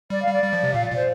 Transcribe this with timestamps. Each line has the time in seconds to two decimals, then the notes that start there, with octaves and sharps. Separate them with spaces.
0.10 G3 D5
0.22 G3 F5
0.33 D5
0.43 G3
0.53 F3
0.63 C3
0.74 A#2 F5
0.86 A#2 D5
0.96 C5